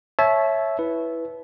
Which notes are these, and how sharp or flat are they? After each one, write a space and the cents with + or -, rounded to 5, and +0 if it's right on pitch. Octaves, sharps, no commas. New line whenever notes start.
C#5 -10 E5 +0 A5 -30
E4 +0 B4 +0